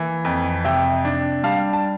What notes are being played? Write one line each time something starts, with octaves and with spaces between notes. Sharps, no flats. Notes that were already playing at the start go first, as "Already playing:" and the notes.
Already playing: E3 A#3
F2
C3 E5 G5
D4
G3 F5 A5
A5